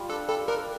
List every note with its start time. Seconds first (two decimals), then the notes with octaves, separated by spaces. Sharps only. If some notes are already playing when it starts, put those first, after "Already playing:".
Already playing: G3 F4
0.09 D4 A4
0.28 G3 A4
0.48 D4 A#4